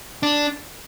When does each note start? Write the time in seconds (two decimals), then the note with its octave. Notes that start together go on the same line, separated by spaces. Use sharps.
0.23 D4